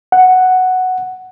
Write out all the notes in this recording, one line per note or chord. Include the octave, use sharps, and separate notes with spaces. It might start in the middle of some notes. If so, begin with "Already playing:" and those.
F#5